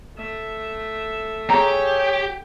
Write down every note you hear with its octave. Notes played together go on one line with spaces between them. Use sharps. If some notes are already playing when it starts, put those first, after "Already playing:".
A3 E5
G4 G#4 C#5 A#5